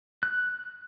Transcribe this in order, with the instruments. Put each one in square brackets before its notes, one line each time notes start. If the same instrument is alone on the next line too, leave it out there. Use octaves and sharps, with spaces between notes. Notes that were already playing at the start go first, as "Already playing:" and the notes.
[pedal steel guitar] F#6